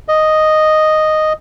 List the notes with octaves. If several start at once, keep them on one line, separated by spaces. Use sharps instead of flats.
D#5